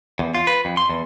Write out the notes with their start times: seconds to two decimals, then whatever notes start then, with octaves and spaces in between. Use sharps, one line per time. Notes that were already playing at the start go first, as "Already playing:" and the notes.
0.19 E2
0.35 F4
0.47 B4
0.65 F2
0.77 C6
0.89 E2